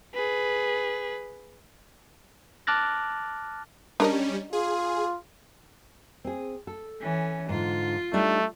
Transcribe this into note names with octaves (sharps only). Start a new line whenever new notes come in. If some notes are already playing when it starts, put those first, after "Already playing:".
G#4 B4
A5 D6 F6 F#6 A6 A#6
G3 C#4 D4 A#4 D#5
F4 G#4
C4 G#4
A4
E3 C#4
G#2 D3 F4
G3 A3 D4 D#4